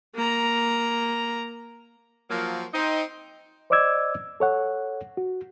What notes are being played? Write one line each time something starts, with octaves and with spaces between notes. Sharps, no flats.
A#3 A#5
F3 F#3 A#3
C4 D#4
C5 D5 D#5 D6 E6 G#6
A4 C#5 F#5
F#4